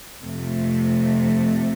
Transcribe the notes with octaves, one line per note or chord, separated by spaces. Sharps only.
F2 C3 A3